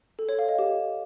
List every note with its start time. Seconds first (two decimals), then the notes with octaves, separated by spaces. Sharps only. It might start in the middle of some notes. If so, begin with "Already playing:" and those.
0.19 A4
0.29 C#5
0.39 F5
0.49 D#5
0.59 G4